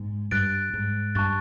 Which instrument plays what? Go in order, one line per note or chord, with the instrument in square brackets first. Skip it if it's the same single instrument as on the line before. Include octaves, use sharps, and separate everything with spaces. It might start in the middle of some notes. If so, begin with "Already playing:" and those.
Already playing: [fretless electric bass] G#2
[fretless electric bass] G2 [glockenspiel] F#6 A6 D7
[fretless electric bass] G#2
[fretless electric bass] G2 [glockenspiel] A5 C#6 F#6 A6